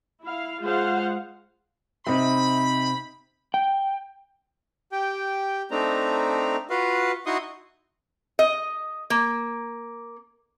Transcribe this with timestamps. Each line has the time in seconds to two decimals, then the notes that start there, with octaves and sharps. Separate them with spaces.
0.22 E4 F5
0.60 G#3 F4 G#4 C5 F5 F#5
2.07 C3 C4 D#4 E5 B5
3.54 G5
4.92 G4 G5
5.71 A3 C4 D4 D#4 A#5
6.70 F4 F#4 B4 F5
7.26 D#4 E4 F#4 C6 C#6 D#6
8.39 D#5
9.10 A#3